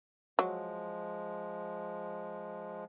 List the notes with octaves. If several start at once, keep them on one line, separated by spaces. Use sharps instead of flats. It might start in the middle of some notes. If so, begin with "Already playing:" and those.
F3 F#3 G#3